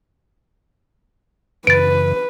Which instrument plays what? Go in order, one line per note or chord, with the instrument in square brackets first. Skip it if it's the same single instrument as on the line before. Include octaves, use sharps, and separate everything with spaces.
[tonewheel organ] F#2 C#3 E3 [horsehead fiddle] B4 [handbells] A6 D7